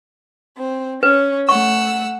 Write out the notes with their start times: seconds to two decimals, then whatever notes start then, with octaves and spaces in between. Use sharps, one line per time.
0.57 C4
1.03 C#4 B4
1.49 A3 F#5 C#6 E6